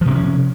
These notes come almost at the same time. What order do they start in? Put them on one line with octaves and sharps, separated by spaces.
F3 C3 C4 C#4